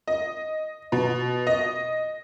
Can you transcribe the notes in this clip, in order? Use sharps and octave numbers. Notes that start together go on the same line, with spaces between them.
D#5
B2
D#5